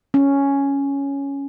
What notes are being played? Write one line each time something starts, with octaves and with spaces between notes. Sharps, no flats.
C#4